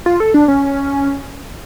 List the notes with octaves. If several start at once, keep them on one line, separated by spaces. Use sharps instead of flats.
F4
A4
D4
C#4